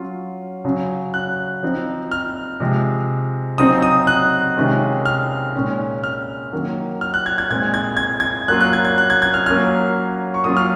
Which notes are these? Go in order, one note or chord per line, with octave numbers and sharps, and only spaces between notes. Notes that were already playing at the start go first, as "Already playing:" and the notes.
Already playing: F#3 C#4 F4
C#3 F#3 C#4
F#6
F3 C4 D#4
F6
C3 F3 G#3
C#3 F#3 C4 D#4 D#6
D#6
F#6
C3 D#3 G#3 C#4 F4
F6
A#2 G#3 C#4
F6
D#3 F#3 A#3
F6
F#6
G#6
G#6
A#2 G#3 C4 G#6
G#6
G#6
G#6
F#3 A#3 C#4 F4 F#6
F#6
G#6
G#6
F#6
G#6
G#6
F6
F#3 A#3 C#4 F4 F6
C#6
F#3 A#3 C#4 F4 D#6
F6